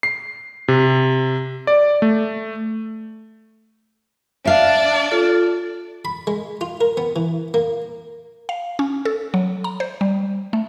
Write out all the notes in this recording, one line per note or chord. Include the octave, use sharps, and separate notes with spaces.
C7
C3
D5
A3
D4 D5 E5 F5
F4 A4
B5
G#3
F4
A#4
B3
E3
A#3
F5
C#4
A4
F#3
A#5
C5
G3
A3